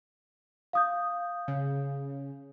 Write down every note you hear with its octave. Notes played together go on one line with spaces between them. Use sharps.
F5 D#6 G6
C#3